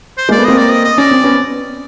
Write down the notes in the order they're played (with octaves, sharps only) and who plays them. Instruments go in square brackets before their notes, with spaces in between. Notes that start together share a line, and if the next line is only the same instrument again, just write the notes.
[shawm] C5
[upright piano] G#3 A#3
[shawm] D5
[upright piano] A3 B3
[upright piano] A#3 C4 [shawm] D#5
[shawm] D5
D#5
D#5
[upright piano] C#4 [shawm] D5
[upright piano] C4
B3 C#4